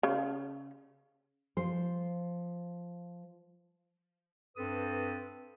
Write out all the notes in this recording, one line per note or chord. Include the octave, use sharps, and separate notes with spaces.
C#3
F3 C5
G2 C4 A4 B4 D#6